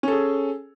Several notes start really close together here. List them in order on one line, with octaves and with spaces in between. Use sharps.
C#4 A4 G#4